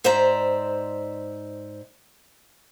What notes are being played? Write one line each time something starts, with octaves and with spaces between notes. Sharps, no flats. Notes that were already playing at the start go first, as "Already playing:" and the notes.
G#2 C5 D5 E5 A#5